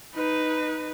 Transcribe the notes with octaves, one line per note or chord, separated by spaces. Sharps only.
D#4 B4